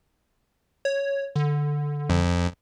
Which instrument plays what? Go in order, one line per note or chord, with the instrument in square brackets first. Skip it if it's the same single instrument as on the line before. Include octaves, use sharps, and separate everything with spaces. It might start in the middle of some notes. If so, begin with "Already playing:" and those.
[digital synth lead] C#5
D3
[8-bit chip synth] F2